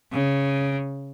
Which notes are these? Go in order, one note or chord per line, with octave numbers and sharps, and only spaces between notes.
C#3